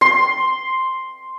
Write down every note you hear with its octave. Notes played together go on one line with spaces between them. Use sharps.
C6